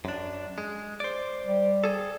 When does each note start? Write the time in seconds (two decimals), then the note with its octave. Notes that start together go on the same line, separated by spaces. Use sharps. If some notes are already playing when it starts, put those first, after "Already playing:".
0.05 F#2 D4
0.58 G#3
1.00 C5 D5
1.46 G3
1.84 G#4 A4